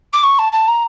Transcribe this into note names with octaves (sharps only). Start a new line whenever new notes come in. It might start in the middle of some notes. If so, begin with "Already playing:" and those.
D6
C#6
A5
A5
A#5